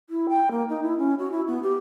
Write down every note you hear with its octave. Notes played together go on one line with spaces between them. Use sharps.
E4
G5
A#3
D#4
E4
C#4
F#4
E4
B3
G4